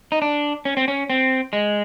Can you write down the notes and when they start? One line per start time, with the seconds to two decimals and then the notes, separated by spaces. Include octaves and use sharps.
0.12 D#4
0.22 D4
0.65 C#4
0.77 C4
0.88 C#4
1.10 C4
1.53 G#3